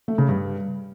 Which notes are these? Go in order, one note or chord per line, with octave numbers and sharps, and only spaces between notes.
A3
C#3
G2